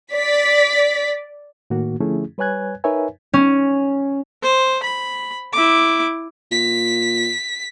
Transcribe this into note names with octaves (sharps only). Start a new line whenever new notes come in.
D5 B6
A2 D#3 A#3 F#4
D3 F3 A3 C#4 E4 G#4
G3 B4 C#5 G#5 F#6 G#6
D#4 A#4 B4 C#5 E5 G#5
C#4
C5
B5
E4 D6
A#2 B6